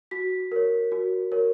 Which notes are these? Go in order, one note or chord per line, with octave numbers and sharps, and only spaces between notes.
F#4 B6
A#4 C#5
F#4
A#4 C#5